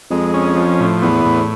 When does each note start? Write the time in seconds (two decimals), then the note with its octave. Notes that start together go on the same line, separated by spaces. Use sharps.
0.10 F2 G#3
0.34 C#4
0.56 F3
0.80 A2
1.02 E2 B3
1.25 A2